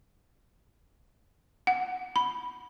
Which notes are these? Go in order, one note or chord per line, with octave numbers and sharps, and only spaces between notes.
F#5
B5